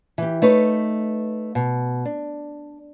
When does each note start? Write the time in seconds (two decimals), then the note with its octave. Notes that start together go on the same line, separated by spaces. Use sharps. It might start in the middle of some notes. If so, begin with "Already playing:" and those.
0.18 E3 G4
0.42 A3 D#4 B4 C#5
1.55 B2
2.05 D4